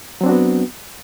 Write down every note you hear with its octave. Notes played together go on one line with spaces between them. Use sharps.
F#3 B3 C4 D4 F#4